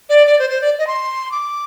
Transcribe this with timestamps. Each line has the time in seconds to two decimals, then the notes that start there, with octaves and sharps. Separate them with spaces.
0.09 D5
0.27 D5
0.39 C5
0.50 C5
0.61 D5
0.79 D#5
0.87 C6
1.31 D6